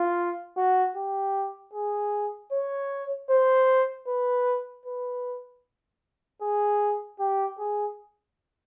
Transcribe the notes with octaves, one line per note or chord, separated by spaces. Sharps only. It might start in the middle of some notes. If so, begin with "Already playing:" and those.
Already playing: F4
F#4
G4
G#4
C#5
C5
B4
B4
G#4
G4
G#4